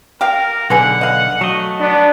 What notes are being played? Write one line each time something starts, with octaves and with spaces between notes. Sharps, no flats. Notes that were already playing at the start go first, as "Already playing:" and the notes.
G4 A#4 F5
B1 D3 G#4 B4 F#5
D#5 F5
F#3 A3 D#5
B3 D4